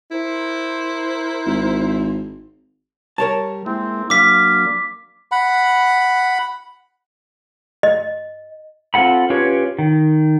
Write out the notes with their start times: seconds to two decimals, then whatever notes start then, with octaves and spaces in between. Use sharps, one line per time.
0.12 E4 A#4 C5
1.46 G#1
3.18 G3 A#4 C#5 A5
3.66 G#3 A#3 C4 E4
4.10 F#3 A#3 D4 F5 D6 B6
5.32 F#5 B5
7.83 D#5
8.94 C4 F4 A4 F#5 B5
9.30 C#4 F4 G4 B4 C#5
9.79 D#3